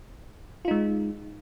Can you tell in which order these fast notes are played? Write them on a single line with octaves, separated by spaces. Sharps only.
F4 D#4 G#3